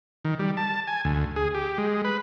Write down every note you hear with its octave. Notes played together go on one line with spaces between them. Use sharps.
D#3
G3
A5
G#5
D2
G#4
G4
G#3
B4